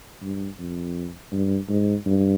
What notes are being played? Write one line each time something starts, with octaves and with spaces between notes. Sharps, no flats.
G2
F2
G2
G#2
G2